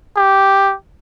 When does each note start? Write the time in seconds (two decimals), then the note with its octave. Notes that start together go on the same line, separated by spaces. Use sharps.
0.16 G4